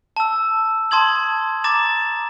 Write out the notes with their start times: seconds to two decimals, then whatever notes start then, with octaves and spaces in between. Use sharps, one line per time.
0.16 A5 E6
0.91 A5 C6 D#6 G#6 F#7
1.64 A#5 D6 A6 E7